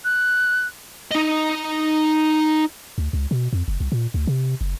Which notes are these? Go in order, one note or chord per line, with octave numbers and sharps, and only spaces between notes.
F#6
D#4 D#5
D2
C#2
B2
F2
F#1
C2
A#2
D2
C3
F#1